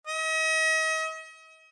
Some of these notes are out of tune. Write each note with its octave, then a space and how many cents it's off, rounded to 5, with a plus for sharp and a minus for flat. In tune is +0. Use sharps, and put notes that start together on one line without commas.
D#5 +40